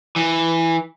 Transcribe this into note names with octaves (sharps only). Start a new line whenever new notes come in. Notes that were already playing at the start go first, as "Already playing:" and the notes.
E3